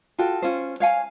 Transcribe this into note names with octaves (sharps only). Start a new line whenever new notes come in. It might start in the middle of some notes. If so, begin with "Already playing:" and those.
F4 F#4 A4 G5
C#4 F4 C5
C#5 F5 G#5